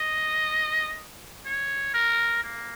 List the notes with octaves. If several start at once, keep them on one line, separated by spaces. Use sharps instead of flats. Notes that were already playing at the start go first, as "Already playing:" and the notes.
Already playing: D#5
C#5
A#4
A#3